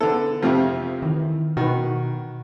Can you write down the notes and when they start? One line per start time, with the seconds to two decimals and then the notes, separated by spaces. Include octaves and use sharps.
0.01 D3 B3 E4 A4
0.42 F2 C3 F3 A3 C4
1.02 D#3 E3
1.57 B2 D#3 F#4 B4